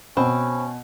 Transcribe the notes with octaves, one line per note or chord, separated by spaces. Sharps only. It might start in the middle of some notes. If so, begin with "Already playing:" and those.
B2 C4 C#4 B5